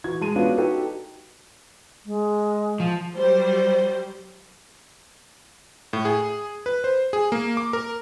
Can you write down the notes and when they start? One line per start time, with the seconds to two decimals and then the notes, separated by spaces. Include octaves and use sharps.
0.04 E3 F#4 G#6
0.21 G#3 A5 D#7
0.36 B3 C#4 D4 F4 F#4
0.58 D#4 F#4 G4 A4 B4
2.06 G#3
2.80 F3
3.15 F#3 G3 C5
5.93 A2
6.05 G#4
6.66 B4
6.84 C5
7.13 G#4
7.32 A#3
7.57 D6
7.73 A#4